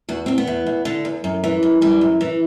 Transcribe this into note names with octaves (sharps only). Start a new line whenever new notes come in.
E2 F#4
E2 C4
B3
E2
E2
D3
E2
F#2
E3
F#2
E3 G3
F#2
E3